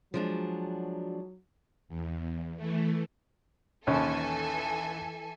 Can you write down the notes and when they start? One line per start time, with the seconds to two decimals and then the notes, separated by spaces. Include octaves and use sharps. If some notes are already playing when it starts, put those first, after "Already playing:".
0.14 F3 F#3 G#3 D4
1.88 E2
2.56 E3 A3
3.87 A#1 D#2 E3 C#4 A4 G#5